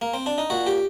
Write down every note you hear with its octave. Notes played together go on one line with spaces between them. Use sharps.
A#3
C4
D4
D#4
A#2 F#4
G4